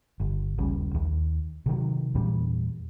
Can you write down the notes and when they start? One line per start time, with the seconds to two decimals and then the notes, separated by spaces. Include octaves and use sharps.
0.20 G1
0.58 D#1 A#1 C#3 G3
0.94 D#2
1.66 C3 D#3 F#3
2.15 E2 A#2 E3 G3